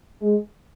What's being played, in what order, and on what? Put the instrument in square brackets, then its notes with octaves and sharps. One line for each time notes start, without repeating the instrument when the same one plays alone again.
[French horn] G#3